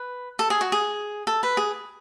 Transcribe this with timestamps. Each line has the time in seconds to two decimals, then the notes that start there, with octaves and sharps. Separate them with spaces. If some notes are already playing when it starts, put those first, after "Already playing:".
Already playing: B4
0.39 A4
0.50 G#4
0.61 F#4
0.72 G#4
1.27 A4
1.43 B4
1.57 G#4